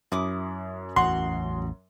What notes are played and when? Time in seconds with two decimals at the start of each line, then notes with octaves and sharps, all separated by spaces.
0.12 F#2 E4 D6 D#6
0.96 A1 E2 F#4 A#5 C6